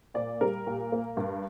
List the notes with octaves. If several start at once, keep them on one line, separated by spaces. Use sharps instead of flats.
A#2 D5
G3 A#4
A#2
A#3
G2